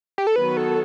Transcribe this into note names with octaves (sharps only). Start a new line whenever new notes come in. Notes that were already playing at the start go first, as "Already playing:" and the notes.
G4
A4
D#3 F#3 B3 F#4 B4
A4